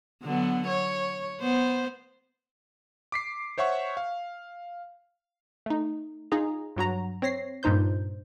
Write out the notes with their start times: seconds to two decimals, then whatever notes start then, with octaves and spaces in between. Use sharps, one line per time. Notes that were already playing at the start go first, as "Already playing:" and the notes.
0.23 D3 F#3 B3
0.67 C#5
1.41 B3 C5
3.12 D6 B6 C7
3.58 C5 C#5 E5 F#5 C#6
3.97 F5
5.66 A3 D#4
6.32 D#4 F4 G#4 A#5
6.77 G2 F#3 F#4 A#5
7.22 C4 C#5 A#6 C7
7.63 G2 A#2 D#4 C5 G6